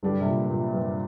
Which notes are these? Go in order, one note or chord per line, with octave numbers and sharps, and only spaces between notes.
G2 D3 G3 D4 G4
C3
A#2
A#2
G2